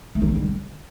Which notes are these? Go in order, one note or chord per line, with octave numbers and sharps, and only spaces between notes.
A3
E3
C4
G3
D3